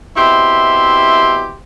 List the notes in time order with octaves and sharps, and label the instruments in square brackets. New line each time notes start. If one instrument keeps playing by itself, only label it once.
[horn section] B2 C4 E4 G4 E5 C6